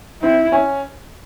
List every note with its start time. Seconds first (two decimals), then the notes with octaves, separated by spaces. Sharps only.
0.22 C4 E4
0.52 C#4